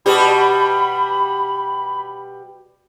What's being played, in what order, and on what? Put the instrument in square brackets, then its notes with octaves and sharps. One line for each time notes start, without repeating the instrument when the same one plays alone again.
[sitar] B2 G3 G4 [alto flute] B5